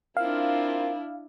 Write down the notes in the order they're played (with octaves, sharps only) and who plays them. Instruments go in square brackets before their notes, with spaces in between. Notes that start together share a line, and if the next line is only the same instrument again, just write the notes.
[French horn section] C4 F4 A#4 [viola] D4 E4 [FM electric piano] F5